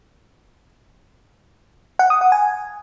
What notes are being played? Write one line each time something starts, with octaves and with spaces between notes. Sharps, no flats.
F#5
D#6
F#5
G#5